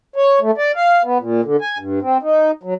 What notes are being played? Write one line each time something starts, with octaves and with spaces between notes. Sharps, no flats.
C#5
A3
D5
F5
B3
A#2
D3
G#5
G2
C4
D#4
F#3